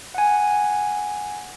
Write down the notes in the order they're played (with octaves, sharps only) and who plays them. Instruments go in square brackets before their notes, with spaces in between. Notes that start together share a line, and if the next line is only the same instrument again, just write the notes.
[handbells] F#5 G#5